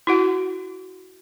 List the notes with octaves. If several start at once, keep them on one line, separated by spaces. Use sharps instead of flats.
E4 F#4 F#5